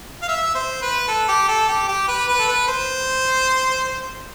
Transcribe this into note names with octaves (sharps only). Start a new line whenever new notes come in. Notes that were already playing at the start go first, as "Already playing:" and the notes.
F5
E5
C5
B4
A4
G4
A4
G4
G4
B4
B4
A4
B4
C5